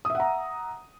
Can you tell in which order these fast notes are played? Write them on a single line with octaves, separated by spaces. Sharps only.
D#6 E5 F#5 A#5